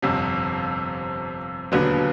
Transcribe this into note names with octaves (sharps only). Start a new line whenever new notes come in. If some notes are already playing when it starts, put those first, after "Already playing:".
G1 F2 C3
E1 D#2 D3 F#3 B3